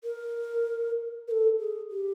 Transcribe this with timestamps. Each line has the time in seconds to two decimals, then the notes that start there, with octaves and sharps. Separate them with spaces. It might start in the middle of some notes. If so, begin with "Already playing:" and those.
0.04 A#4
1.28 A#4
1.31 A4
1.59 G#4
1.91 G4